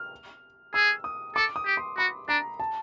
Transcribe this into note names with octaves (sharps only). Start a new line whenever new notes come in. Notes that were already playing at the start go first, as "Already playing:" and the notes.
Already playing: F6
G#4 E6
D#6
A4 D6
D#6
G4
C6
F#4 B5
D4 A#5
A5